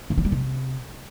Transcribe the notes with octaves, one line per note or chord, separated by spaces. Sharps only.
C#3
F3
G3
C3